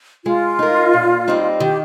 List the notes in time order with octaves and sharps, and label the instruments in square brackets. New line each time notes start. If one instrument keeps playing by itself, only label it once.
[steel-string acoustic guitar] G#3 [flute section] F4
[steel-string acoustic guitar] D#4 A#4
A#2
G3 C4 D#4
[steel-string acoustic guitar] D#3 [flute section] G4